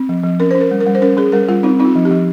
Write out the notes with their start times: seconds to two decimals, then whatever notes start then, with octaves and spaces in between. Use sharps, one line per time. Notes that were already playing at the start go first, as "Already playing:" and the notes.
Already playing: C4
0.09 F3
0.23 F3
0.40 C#4 A#4
0.51 C#4 C5
0.61 A#4
0.71 G3
0.81 A#4
0.87 G3
0.95 C5
1.02 C#4 A#4
1.17 C#4 G#4
1.32 G3 A#4
1.48 G3 F4
1.63 C4 D#4
1.80 C4 D#4
1.85 F4
1.96 F3
2.05 G4
2.11 F3